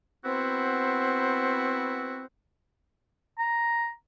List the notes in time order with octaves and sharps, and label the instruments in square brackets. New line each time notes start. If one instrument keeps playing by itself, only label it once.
[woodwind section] B3 C4 E4 F#4 C5
[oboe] A#5